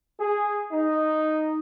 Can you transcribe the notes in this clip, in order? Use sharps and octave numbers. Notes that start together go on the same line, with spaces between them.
G#4
D#4